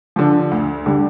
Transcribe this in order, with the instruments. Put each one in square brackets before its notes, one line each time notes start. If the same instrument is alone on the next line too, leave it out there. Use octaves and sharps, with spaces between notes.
[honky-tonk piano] D3 F3
D2
D3 G3